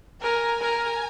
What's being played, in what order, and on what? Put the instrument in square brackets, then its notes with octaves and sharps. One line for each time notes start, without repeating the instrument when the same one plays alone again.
[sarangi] A#4 [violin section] G#5 A#5
[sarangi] A#4